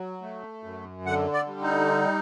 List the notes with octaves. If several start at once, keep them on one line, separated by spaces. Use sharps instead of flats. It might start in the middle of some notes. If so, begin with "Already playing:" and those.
Already playing: F#3
A3
F#2
D3 F#5
D5
G3
D#4